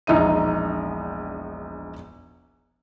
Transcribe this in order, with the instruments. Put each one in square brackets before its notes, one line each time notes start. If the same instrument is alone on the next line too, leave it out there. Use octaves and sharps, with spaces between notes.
[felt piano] E1 A#1 D#4 E5 D#7